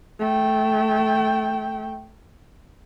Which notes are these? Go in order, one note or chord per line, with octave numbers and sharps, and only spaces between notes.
A3 G5